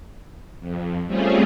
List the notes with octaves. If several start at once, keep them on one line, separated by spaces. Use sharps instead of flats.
F2
G3 A3 C4 C#4 F4 G#4